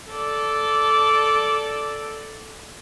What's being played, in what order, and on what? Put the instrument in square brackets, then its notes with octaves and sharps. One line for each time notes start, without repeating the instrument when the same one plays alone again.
[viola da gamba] A4 D5